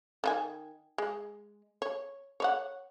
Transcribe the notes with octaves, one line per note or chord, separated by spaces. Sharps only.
D#3 F4 G#5
G#3
C#5
C#5 D5 F#5